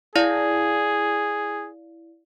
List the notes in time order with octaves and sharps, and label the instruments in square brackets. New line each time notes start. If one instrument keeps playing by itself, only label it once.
[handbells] E4 D5 F5 [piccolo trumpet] G#4